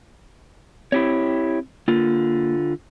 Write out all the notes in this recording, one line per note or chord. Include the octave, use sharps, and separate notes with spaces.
C4 E4 G4 C#5
D3 A#3 F4